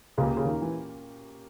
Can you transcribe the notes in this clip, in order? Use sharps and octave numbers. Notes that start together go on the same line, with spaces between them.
C#2 A#2 C#3 A#3 C#4 G4 A#4
C#3
D#2 D#3
E3